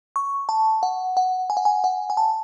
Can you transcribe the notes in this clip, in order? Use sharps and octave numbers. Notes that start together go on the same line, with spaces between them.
C#6
A5
F#5
F#5
G#5
F#5
G#5
F#5
G#5
A5